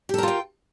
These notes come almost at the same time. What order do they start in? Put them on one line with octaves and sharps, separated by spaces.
G4 A4 A#4 F4 G5